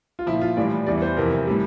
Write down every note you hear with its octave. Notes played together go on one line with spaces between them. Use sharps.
F4
A#2 F3 E4
F4
A2 E3 G3 D5
E2 E3 G3 D5
C5
F2 C3 E3 A#4
A2 G3